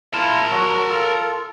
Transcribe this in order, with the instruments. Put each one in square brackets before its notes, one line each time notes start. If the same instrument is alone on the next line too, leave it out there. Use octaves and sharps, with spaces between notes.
[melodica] E4 F4 [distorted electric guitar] A#4 A5
[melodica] F#3 F#4
F4 A4